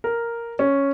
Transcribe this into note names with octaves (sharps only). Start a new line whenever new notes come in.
A#4
C#4